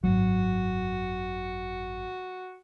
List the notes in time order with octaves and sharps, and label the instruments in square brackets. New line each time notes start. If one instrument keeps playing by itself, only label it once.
[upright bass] G#1 F#2 [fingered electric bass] F#3 [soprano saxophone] F#4